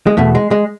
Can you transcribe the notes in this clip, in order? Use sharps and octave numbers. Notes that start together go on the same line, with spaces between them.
G#3
E2 B2 A3
G#3
G#3